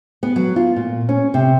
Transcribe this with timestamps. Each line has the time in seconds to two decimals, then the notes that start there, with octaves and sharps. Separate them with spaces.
0.23 B3
0.36 F#3
0.56 F4
0.76 A#2
1.09 C#4
1.34 C3